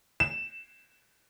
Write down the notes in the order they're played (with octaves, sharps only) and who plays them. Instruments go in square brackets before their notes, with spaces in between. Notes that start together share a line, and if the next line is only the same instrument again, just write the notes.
[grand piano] E7